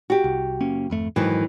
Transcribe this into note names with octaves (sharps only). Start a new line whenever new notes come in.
F#4 G4
C2
F#1 A#3 C#4
G#1 F2 A3
F2 G#2 D#3 E3 F#3